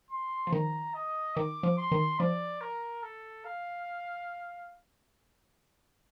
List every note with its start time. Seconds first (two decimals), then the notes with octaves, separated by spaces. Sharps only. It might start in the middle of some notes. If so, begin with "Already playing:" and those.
0.11 C6
0.47 F3
0.52 D#3 A#5
0.94 D#5
1.36 D#3 D6
1.63 F3
1.78 C6
1.92 D#3
2.19 F3 D5
2.61 A#4
3.03 A4
3.45 F5